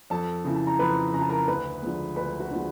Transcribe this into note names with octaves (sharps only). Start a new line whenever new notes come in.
F2 A4 A5
C#3 E3
A5
A#5
F2 B4 B5
C#3 E3 A5 A#5
A#4 A#5
D2 B4 B5
D3 F3 G#3
D2 B4 B5
F#4 F#5
D3 F3 G#3